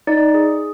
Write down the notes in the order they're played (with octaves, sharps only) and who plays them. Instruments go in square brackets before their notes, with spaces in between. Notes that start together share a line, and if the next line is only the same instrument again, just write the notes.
[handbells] D#4 D5
G#4